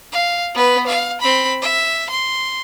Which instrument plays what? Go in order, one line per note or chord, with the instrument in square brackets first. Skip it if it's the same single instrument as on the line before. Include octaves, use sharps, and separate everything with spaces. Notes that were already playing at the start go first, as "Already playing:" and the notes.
[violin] F5
B3 B4
F5
C4 B5
E5
C6